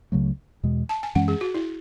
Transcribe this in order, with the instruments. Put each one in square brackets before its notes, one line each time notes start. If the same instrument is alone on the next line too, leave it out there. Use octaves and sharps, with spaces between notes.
[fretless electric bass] C#2 C#3 F#3 A3
E2 B2 G#3
[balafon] A5
G#5
[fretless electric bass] F#2 E3 G#3 C#4 [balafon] F#5
[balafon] G#4
F#4
E4